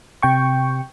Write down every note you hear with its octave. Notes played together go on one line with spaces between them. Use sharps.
C3 G5 C#6